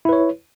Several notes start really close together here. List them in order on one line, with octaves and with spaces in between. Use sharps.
E4 B4 C#5